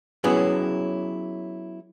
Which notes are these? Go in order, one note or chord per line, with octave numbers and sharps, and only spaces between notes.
F#3 B3 C#4 E4 G#4